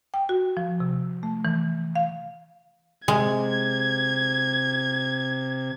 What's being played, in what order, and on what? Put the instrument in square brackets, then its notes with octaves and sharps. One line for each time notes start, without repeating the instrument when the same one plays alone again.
[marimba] G5
F#4
F3
C3
A3
E3
F5
[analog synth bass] C3 [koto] G#3 [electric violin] G#6